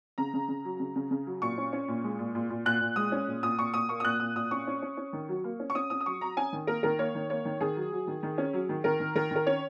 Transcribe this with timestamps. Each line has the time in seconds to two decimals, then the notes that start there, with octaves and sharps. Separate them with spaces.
0.18 C#3 A#5
0.33 C#3
0.48 C#3
0.65 F#3
0.80 C#3
0.96 C#3
1.11 C#3
1.27 F#3
1.42 A#2 C#6
1.58 C#4
1.73 C#4
1.88 A#2
2.04 G#3
2.19 A#2
2.35 A#2
2.50 A#2
2.65 A#2 F#6
2.81 A#2
2.96 G#3 D#6
3.12 C#4
3.27 A#2
3.43 A#2 D#6
3.58 A#2 C#6
3.74 A#2 D#6
3.89 A#3 C#6
4.00 D#6
4.05 A#2 F#6
4.20 A#2 D#6
4.35 A#2 D#6
4.51 C#4 C#6
4.67 C#4
4.82 C#4
4.97 C#4
5.13 D#3
5.29 F#3
5.44 A#3
5.60 C#4
5.70 C#6
5.75 C#4 D#6
5.90 C#4 D#6
6.01 D#6
6.06 F#3 C#6
6.21 F#3 A#5
6.37 C#4 G#5
6.53 D#3
6.67 A#3 A#4
6.83 D#3 A#4
6.99 A#3 C#5
7.15 D#3
7.30 A#3 C#5
7.45 D#3
7.61 D#3 G#4
7.76 F#3
7.92 F#3
8.07 D#3
8.23 D#3
8.38 C#4
8.53 F#3
8.69 D#3
8.84 D#3 A#4
9.00 D#3
9.15 D#3 A#4
9.31 D#3 A#4
9.46 C#4 C#5